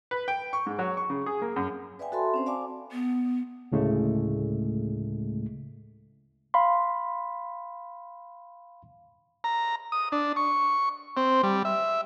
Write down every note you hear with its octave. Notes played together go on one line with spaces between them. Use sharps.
B4
G5
C#6
G#2
F#3
C#6
C#3
G#4
A#3
F#2
B4 D5 E5 F5 G5 G#5
F#4 A4 E5 A5 B5 C6
C4 C#4 C5
D5 F5 G#5 A5 B5 D6
B3
D2 A2 C#3 G#3 A3
F5 B5 C6
A#5
D#6
D4
C#6
C4
G3
E5